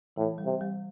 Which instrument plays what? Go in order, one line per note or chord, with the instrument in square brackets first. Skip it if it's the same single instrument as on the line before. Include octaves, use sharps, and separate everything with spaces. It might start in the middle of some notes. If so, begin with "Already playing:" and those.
[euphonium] A2 [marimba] E3
[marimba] G3
[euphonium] C3
[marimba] G3